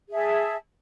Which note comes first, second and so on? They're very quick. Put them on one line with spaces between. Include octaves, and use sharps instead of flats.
G#4 E5 A5